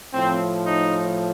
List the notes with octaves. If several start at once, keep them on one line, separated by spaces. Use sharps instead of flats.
A2 F3 C4
D#4